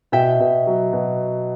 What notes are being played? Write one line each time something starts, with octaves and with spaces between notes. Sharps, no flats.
B2 E5 G5
B2
F#3
B2